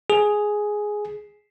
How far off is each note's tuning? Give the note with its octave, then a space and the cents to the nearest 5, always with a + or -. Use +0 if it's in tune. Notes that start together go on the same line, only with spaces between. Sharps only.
G#4 +5